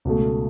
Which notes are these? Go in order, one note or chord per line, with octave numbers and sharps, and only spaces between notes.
C#2 B2 A3